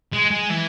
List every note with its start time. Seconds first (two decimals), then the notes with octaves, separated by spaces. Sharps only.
0.13 G#3
0.31 G#3
0.50 E3